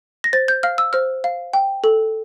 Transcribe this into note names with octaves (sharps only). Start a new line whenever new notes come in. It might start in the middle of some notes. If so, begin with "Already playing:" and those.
A#6
C5 A6
G6
F5 F6
E6
C5 F6
F5
G5
A4